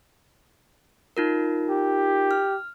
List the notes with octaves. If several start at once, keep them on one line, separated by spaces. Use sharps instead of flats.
D#4 F4 A#4
G4
F6